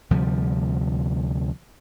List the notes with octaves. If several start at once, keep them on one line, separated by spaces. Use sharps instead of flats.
D2 C3 F3 G3